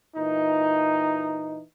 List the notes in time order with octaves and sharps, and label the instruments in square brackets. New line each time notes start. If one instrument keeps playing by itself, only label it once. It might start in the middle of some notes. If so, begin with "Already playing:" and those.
[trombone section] A#2 E3 D#4